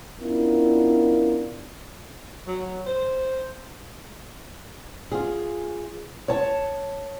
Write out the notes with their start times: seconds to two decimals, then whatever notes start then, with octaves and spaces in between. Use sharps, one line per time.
0.21 B3 C#4 D4 E4 F4 A#4
2.47 F#3
2.87 C5
5.12 F4 G#4
6.28 C#5 A5